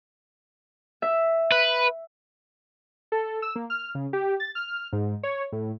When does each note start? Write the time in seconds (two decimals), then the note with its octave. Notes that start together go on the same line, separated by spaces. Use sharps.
1.02 E5
1.52 B4
3.12 A4
3.42 E6
3.56 A#3
3.70 F6
3.95 C#3
4.13 G4
4.40 A6
4.55 F6
4.93 G#2
5.23 C#5
5.52 A2